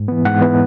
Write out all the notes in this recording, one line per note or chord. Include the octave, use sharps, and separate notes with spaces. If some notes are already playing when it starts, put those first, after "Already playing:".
Already playing: G#2
E3 B3
G#2 F#5
E3 B3